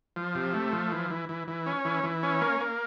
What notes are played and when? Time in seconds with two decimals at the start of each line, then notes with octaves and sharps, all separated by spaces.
0.16 F3
0.35 C3
0.54 A3
0.72 F3
0.92 E3
1.10 E3
1.29 E3
1.48 E3
1.66 C#4
1.85 E3
2.04 E3
2.23 C#4
2.41 A#3
2.60 A#3